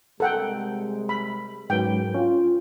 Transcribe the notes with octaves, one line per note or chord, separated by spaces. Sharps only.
C3 G3 G#3 A4 A#4 F#5 G5
B5
G#2 F#3 C#4 A#4 B4 G5
C#4 F4